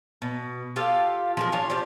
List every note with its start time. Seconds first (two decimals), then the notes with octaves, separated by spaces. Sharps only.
0.22 B2
0.76 F4 G4 A4 F5
1.37 F3 G#3 A#4
1.52 D4 F4 C#5 G#5
1.70 F3 G4 C5 D5